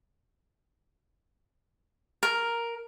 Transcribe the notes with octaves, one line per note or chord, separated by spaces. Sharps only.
A#4